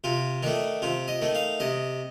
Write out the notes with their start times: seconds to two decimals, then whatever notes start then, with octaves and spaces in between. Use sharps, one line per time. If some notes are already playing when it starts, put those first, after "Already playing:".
0.04 C3 F4
0.43 D#3 A3 D4
0.82 C3 F4
1.08 D#5
1.21 D#3 A3
1.35 F5
1.60 C3 D#5